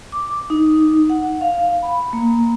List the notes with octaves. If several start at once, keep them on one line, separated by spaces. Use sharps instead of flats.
D6
D#4
F#5
F5
B5
A#3